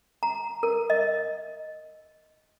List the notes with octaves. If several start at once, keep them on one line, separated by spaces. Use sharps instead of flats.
A#5
A#4
D#5